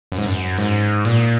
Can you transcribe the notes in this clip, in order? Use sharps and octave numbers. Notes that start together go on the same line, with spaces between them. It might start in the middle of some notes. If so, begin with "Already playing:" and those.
F#2
G#2
F#2
G#2
A#2